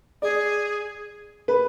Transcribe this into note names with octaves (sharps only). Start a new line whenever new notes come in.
G#4 D5
B4